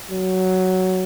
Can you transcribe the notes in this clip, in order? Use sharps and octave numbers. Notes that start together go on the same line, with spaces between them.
F#3